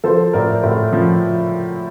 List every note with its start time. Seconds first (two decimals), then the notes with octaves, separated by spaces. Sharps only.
0.04 F3 A4 C5
0.33 A2 A#4 D5
0.63 A2
0.93 F3